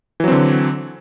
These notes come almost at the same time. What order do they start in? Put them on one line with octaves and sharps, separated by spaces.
E3 F#3 C4 D3